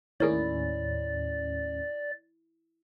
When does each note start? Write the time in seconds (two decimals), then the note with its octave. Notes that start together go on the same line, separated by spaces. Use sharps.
0.20 D#2 A2 C#4 E4 G#4 A#4 C#5 D5